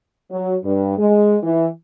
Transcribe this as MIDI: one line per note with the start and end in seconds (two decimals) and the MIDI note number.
0.32 0.56 54
0.65 0.98 43
0.98 1.37 56
1.43 1.67 52